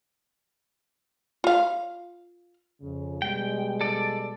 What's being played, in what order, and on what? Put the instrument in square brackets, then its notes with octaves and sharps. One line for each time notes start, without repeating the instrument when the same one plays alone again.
[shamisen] F4 F5
[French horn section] F2 C#3
[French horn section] B2 G3 G#3 [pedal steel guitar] G5
[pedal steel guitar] A4 D5